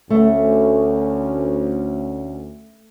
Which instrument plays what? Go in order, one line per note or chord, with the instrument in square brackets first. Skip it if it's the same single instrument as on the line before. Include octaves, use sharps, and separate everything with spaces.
[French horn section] D2 C#4 [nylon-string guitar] A3